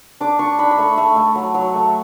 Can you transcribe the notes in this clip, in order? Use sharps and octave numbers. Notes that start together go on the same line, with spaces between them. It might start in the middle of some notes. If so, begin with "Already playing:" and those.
D4 D6
D4 C#6
D4 B5
B5
A3 C#6
A3
A3
F#3
F#3
A3